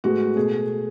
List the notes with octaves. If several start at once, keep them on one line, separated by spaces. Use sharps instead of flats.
A2 G#3 B3 F#4
B2 A3 G#4